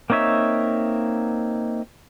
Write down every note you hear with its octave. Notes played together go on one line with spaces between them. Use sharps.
A#3 C4 D#4 C#5 E5